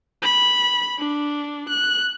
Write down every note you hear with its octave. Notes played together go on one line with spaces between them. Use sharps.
B5
D4
F#6